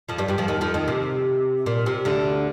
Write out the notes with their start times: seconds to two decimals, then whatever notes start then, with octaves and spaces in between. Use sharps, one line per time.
0.09 F2 F3
0.18 G2 G3
0.28 G2 G3
0.38 F2 F3
0.48 D#2 D#3
0.61 F2 F3
0.74 D#2 D#3
0.88 C3
1.66 A#2
1.86 C3
2.05 D2 D3